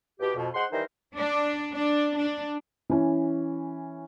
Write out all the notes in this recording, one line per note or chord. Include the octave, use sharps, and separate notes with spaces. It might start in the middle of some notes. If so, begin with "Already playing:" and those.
E2 B2 B3 G4
F2 B2
G#3 C5 F#5 C6
D#3 E3 G3 D#4 A#4 C5
D4
D4
D4
E3 C#4